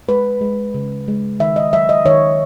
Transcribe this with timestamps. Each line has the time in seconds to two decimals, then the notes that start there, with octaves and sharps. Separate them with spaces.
0.08 G#3 B4
0.41 G#3
0.74 C#3
1.08 G#3
1.40 D#3 E5
1.56 D#5
1.73 F#3 E5
1.89 D#5
2.05 D#3 C#5